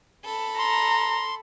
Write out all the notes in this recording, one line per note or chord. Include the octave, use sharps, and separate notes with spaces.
A4 B5
A#5 C6